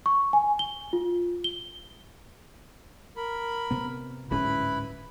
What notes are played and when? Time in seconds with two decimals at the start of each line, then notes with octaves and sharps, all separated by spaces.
0.06 C#6
0.33 G#5
0.59 G7
0.93 F4
1.44 G7
3.16 A#4 B5
3.71 C3 B3
4.31 D1 G#2 C#4 E4 B4 B5